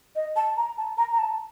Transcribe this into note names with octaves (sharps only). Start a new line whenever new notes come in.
D#5
A5
A#5
A5
A#5
A#5
A5